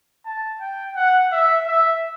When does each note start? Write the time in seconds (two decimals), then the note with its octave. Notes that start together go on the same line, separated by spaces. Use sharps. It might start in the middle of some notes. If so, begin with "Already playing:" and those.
0.26 A5
0.60 G5
0.96 F#5
1.32 E5
1.67 E5